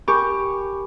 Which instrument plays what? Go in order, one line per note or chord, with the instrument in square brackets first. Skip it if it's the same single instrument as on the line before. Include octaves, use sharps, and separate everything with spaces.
[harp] G4 [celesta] A#4 G#5 B5 [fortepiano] C#6